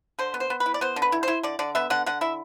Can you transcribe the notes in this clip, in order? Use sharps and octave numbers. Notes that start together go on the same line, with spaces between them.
D3 C5
B3
C5
B3
B4
E4
D5
B3 C5
D3
B4
E4
E4 C5
D3 D5
D3 D5
B3 E5
D3 F#5
D3 F#5
E4 E5